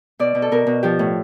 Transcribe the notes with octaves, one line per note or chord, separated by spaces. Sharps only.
B2 D5
B2
A4
B2 A#4
B2
F3 G4
A2